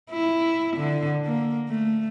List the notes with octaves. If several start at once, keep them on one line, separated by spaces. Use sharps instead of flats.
E4
D3
A#3
A3